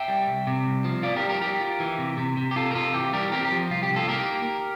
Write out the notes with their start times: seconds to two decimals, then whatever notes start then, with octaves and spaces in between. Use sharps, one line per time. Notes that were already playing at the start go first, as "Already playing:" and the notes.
Already playing: E5 G5
0.08 G3
0.27 C2
0.47 C3
0.66 C2
0.84 F3
1.03 F4 D5 F5
1.16 G4 A#4
1.22 G3
1.29 G4 A#4
1.42 G3 G4 A#4
1.61 F4
1.80 E3
1.98 C3
2.18 C3
2.37 C3
2.51 G4
2.56 C3 F4 A4
2.71 A#4
2.75 C3 F4 A4
2.94 E3 G4
3.13 G3 G4 A#4
3.32 C4 G4 A#4
3.45 G4
3.52 F3
3.70 C2 F4
3.83 G4
3.90 C2
3.96 F4 A4
4.08 A#3 G4 A#4